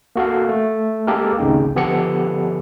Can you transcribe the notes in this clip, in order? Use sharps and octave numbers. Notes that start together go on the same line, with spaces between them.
A#3 F#4 A4 F5
A3
G#3 A#3 G4 A4 A#4
G#1 D2 C#3 D#4 G5
D3 F3 B3 G4 A4 C#7